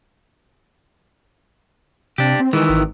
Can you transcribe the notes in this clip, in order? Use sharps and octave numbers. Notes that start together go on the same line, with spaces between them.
C3 D4 G4
C4
D#3 E3 G#3 E4
G#1